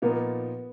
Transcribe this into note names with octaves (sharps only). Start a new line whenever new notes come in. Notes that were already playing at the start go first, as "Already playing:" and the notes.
A#2 F3 A#3 B3 D#4